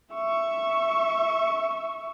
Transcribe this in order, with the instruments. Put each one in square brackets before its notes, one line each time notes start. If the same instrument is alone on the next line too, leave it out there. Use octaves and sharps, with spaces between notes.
[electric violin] E5 C#6